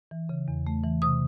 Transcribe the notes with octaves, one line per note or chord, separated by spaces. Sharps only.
E3
C#3
E2
A3
E3
C3 D#6